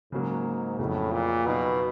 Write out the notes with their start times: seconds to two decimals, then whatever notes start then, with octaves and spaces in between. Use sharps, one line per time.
0.12 G#2 C#3 F#3 A#3
0.79 F2 A2 C#3 F#3
1.13 A#2
1.46 B2 F#3 B3 D#4